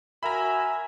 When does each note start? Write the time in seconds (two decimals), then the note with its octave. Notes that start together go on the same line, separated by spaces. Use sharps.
0.23 F#4 A#4 E5 G#5 A#5 B5